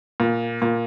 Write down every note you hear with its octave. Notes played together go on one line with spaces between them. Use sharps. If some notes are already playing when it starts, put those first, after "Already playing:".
A#2
A#2